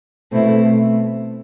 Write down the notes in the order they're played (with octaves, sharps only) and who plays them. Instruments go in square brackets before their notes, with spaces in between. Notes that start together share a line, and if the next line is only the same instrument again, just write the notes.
[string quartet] B2 A3 C4 E4